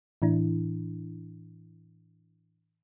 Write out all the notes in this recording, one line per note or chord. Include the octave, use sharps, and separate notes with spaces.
A2 E3 D4 E4